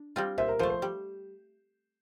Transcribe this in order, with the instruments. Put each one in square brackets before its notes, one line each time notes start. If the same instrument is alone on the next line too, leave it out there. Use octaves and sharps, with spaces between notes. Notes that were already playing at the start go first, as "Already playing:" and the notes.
Already playing: [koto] D4
G3 C4 F4
[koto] A#2 [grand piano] C5 E5
[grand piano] A#4
[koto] F3 [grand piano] C5
[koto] A3
[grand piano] C5
[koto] G3